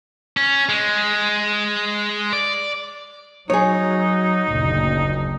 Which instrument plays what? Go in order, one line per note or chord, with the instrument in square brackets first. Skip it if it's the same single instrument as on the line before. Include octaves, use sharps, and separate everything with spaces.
[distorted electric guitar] C#4
G#3
D5
[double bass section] F#3 [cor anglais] D#4 [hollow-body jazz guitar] G#4 C#5
[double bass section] F#1 D2 A#2